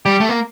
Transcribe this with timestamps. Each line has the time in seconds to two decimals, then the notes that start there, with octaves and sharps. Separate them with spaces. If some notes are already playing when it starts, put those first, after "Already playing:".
0.05 G3 G4
0.20 A3
0.29 A#3